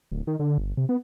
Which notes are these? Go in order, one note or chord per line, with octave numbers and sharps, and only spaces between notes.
D1
D#3
D3
G1
C3
B3